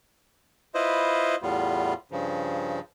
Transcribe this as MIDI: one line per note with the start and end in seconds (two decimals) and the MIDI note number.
0.75 1.35 64
0.75 1.35 65
0.75 1.35 71
0.75 1.35 72
0.75 1.35 75
1.42 1.94 40
1.42 1.94 45
1.42 1.94 55
1.42 1.94 59
1.42 1.94 65
2.11 2.80 43
2.11 2.80 49
2.11 2.80 53